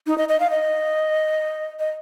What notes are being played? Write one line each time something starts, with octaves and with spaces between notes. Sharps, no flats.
D#4
D#5
D#5
F5
D#5
D#5